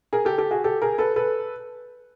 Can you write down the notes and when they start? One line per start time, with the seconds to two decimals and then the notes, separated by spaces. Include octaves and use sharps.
0.13 G#4 A#4
0.25 G4 A4
0.38 G4 A4
0.51 F#4 G#4
0.64 G4 A4
0.82 G#4 A#4
0.98 A4 B4
1.16 A4 B4